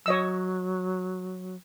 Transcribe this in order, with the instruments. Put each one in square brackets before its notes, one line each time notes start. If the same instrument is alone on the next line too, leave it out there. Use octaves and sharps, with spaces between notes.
[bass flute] F#3 [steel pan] C#5 D#5 E6